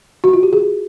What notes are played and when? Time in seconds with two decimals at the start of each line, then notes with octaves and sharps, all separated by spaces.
0.24 F#4
0.33 F4
0.43 G4
0.53 G#4